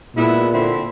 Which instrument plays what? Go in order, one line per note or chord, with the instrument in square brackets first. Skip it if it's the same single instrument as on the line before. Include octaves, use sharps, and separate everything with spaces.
[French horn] A#2 [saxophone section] G#3 B3 E4
[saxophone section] D3 C4 E4